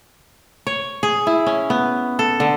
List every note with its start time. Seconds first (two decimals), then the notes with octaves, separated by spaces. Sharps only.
0.67 C#5
1.03 G#4
1.27 E4
1.46 C#4
1.70 B3
2.19 A4
2.40 D3